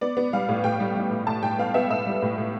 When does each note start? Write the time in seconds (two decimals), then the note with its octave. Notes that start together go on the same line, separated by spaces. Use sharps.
0.01 B3 D5
0.17 B3
0.33 G3 F5
0.49 A2
0.64 A2 G5
0.80 G3
0.96 G3
1.11 A2
1.27 A2 A5
1.42 A2 G5
1.59 B3 F5
1.74 B3 E5
1.90 A2 E5
2.06 G3
2.22 A2
2.38 A2